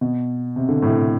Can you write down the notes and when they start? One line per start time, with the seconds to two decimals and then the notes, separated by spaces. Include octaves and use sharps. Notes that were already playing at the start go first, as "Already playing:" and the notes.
0.01 B2
0.56 C3
0.69 D3
0.82 A2 C3